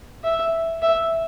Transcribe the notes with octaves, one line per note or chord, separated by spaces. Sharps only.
E5
E5